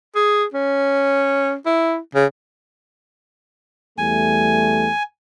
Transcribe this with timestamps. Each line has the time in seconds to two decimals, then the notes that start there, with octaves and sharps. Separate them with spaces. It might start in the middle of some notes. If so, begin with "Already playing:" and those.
0.15 G#4
0.53 C#4
1.66 E4
2.15 C#3
3.98 E2 G3 A3 G#5